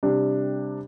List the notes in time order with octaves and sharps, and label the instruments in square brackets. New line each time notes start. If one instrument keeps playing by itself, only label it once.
[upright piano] C3 G3 D4